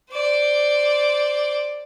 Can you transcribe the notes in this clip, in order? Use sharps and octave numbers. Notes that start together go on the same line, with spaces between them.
C5 D5